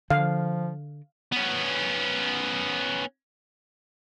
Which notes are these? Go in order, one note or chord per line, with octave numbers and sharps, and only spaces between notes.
D3 F3 F5
B3 C#4